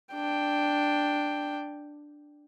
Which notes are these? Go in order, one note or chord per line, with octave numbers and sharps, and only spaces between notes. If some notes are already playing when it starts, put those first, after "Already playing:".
D4 G5